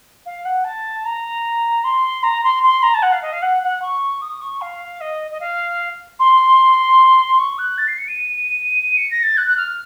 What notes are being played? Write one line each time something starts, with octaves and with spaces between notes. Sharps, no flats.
F5
F#5
A5
A#5
C6
A#5
C6
C6
A#5
A5
F#5
F5
D#5
F5
F#5
F#5
C#6
D#6
C#6
F5
D#5
D#5
F5
C6
C#6
F#6
A6
C7
C#7
D#7
C#7
A#6
A6
F#6
F#6
F6